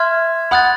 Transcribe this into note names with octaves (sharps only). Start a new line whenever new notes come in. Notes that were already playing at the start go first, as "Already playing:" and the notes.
Already playing: E5 C6 F6 G#6
F#5 B5 D#6 F#6 A6